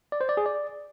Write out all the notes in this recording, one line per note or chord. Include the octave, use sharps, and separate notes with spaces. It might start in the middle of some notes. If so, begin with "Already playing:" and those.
D5
C5
D5
G#4
D5